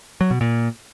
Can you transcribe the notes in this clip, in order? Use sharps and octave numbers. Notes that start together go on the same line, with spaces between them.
F#3
B2
A#2